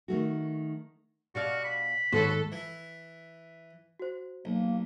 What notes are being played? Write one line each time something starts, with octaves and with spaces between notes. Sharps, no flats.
D#3 A3 F#4
B2 F#4 D5 F5
B5
D#2 G#2 F#4 A4 B4 C#5 C6
E3 E4
F#4 C5
B1 A#3